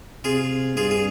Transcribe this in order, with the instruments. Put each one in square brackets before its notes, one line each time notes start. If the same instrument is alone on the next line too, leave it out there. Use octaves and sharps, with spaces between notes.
[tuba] C3 [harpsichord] F4 G#4
[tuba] G2 [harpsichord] F4 G#4
[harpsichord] G#4